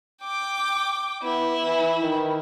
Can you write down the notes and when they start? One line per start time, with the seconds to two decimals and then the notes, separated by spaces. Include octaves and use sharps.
0.23 G5 D6
1.23 B3 E4
1.63 E3
2.02 D#3